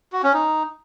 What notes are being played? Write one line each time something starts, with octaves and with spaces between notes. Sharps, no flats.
F#4
C#4
D#4